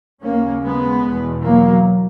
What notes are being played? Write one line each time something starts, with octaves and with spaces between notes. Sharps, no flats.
D#2 C#3 A#3 C#4
G#3 B3
E2 B2
F#3 A#3